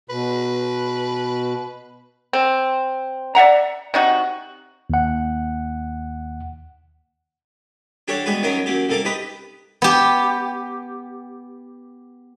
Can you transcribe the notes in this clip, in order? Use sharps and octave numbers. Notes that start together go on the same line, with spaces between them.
B2 B4
C4
D5 E5 F#5 A#5
C3 D#4 F#4
D#2 F#5
D4 G4 A4 C#5 F#5
G3 G#3 B3 F#4 B4
F#2 D#3 F#3 C#4 A#4 F5
F#2 A#3 G4
C2 A#3 A4 F5 D6
D#4 G4 B4 D#6
B3 G4